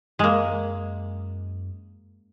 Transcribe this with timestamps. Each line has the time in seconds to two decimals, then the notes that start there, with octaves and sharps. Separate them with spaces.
0.19 F#2 G#3 A#3